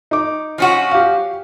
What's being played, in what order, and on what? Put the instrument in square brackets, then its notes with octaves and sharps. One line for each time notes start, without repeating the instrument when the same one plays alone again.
[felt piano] D#4 D6
[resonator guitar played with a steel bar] F3 C#4 F#4
[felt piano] G4 F5